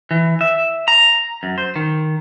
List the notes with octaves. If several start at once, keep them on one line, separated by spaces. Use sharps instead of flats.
E3
E5
A#5
F#2
C5
D#3